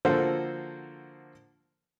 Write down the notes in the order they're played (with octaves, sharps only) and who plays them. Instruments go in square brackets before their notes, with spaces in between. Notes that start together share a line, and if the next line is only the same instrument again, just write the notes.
[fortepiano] D3 F3 A#3 F#4 A4 C5